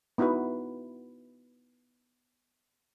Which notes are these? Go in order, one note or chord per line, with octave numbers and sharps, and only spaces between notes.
B3 D#4 E4 F#4 B4